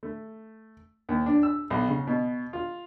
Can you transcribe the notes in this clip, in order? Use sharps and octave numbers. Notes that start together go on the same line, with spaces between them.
A3
D#2
D4
E6
B1
C#3
B2
F4